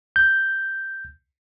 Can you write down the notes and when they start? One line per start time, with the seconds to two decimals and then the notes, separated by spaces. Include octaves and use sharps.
0.16 G6